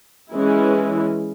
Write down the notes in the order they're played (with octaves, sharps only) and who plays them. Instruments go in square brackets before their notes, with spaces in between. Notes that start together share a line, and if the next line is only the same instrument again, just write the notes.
[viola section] E3 G#3 C#4 E4